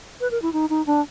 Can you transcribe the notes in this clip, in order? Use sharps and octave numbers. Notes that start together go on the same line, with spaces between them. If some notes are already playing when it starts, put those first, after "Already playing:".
B4
A#4
E4
D#4
D#4
D4